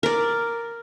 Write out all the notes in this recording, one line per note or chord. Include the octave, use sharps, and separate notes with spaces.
A#4 D5